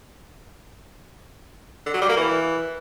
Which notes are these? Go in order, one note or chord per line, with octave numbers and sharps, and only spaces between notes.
D3
F#3
G3
A#3
E3